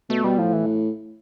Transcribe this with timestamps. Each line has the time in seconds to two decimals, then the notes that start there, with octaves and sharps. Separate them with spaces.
0.09 B2 A3
0.24 B2 G3
0.38 A2 F3
0.53 E3